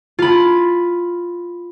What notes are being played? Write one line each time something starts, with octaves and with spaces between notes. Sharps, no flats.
F4 B5